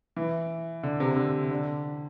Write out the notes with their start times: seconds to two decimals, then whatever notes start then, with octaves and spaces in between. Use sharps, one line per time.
0.16 E3
0.83 D3
1.00 C3
1.16 D3
1.50 D3